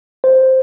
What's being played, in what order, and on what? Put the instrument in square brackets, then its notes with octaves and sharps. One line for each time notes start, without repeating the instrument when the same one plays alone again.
[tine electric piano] C5